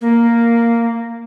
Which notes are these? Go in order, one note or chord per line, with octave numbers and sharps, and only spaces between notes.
A#3